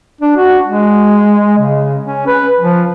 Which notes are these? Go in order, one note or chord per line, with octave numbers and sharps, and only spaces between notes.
D4
F#4
G#3
C#3
C#4
B4
F3